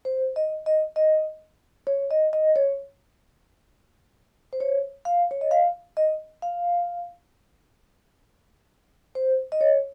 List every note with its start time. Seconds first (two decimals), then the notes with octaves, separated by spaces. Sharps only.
0.05 C5
0.36 D#5
0.66 D#5
0.96 D#5
1.87 C#5
2.11 D#5
2.33 D#5
2.56 C#5
4.53 C5
4.60 C#5
5.05 F5
5.31 C#5
5.41 D#5
5.51 F5
5.97 D#5
6.42 F5
9.15 C5
9.52 D#5
9.61 C#5